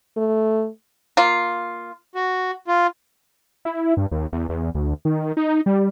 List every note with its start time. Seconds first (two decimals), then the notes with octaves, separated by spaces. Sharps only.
0.17 A3
1.17 A#3 F4
2.15 F#4
2.68 F4
3.65 E4
3.97 G2
4.11 D#2
4.33 E2
4.49 E2
4.75 D2
5.05 D#3
5.37 D#4
5.66 G3